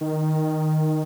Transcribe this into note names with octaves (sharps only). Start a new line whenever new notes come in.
D#3